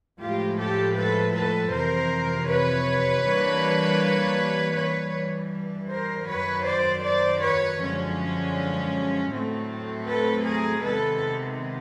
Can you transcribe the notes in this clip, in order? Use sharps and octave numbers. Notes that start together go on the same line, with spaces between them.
A2 F3 G#3 F4 G4
G4 A4
A4 B4
A4 B4
F2 C3 E3 A#4 C5
B4 C#5
G2 E3 G3 A#3 D4
G2 E3 G3 B4 C#5
A#4 C5
F#2 D#3 F#3 B4 C#5
C5 D5
C5 D5
B4 C#5
F#2 D3 F3 G#3 C#4
A2 F#3 A3 C4
A4 B4
G#4 A#4
C3 D#3 G#3 B3 A4 B4